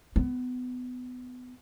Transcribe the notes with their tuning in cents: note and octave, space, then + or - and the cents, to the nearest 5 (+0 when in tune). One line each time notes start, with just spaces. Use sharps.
B3 +25